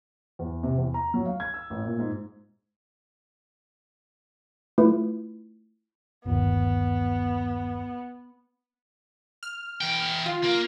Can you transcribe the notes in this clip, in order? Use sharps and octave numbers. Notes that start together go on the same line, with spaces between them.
E2
C3
E2
A#5
F#3
F5
G#6
E6
A1
A#2
G#2
A3 E4 F4 B4
G1 D#2 B3
F6
E3 G5
F4
A#3